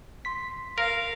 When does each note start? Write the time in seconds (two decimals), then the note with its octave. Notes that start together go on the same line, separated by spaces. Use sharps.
0.25 C6 B6
0.78 A#4 F5